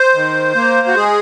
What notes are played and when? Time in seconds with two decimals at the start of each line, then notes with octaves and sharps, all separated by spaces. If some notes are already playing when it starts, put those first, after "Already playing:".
Already playing: C5
0.14 D#3
0.55 A#3
0.88 F#4
0.96 G#3 G#4